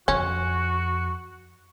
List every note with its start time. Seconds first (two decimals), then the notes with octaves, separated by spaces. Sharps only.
0.08 F2 C#4 F#4